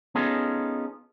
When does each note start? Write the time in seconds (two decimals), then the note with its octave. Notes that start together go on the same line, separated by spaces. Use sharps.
0.15 B3 C#4 D#4 F4 G#4 A4